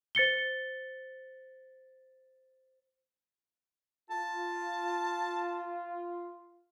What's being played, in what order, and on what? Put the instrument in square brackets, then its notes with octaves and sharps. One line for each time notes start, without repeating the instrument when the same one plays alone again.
[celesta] C5 A6 C#7 G7
[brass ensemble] F4 [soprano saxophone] A5